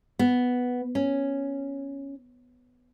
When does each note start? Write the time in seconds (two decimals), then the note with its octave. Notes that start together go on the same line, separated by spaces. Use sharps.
0.19 B3
0.95 C#4